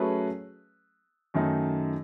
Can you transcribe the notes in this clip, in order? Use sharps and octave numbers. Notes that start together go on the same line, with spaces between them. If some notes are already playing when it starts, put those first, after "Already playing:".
Already playing: F#3 A3 C#4 G#4 B4
F#2 D#3 A3 D#4